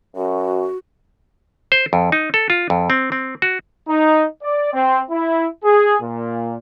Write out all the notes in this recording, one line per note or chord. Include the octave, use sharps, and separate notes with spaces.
F#2 F#4
C5
F2
D#4
A4
F4
F2
C4
C4
F#4
D#4
D5
C4
E4
G#4
A#2